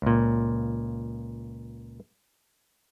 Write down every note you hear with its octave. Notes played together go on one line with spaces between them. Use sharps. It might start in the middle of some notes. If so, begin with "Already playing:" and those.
C#2 A#2